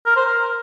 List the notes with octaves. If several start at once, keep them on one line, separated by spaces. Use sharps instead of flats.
A#4
C5
A#4